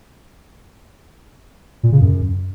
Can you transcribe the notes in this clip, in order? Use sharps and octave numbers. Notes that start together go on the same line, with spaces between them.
A#2
C#3
F#2